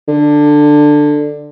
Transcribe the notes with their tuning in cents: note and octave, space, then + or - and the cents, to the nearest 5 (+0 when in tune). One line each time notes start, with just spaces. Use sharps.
D3 +10